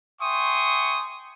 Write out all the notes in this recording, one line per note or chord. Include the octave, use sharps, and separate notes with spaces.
E5 G5 G#5 C6 C#6 D#6